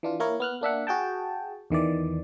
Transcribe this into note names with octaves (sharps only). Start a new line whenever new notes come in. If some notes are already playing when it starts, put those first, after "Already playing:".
E3 D4 F4
A#3 E4 A#4 C#5
B3 F6 F#6
A#3 D4 E5 F#5
F#4 G#4 G5 A5
E2 D#3 E3 D5